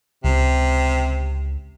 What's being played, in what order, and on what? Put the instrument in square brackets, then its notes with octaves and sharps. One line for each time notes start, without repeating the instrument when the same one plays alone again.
[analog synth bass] C#2 [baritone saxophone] C3